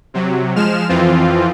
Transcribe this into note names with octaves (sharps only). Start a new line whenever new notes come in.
C3 F#3
F3 G#3 F6 E7
F2 E3 F3 C4 F4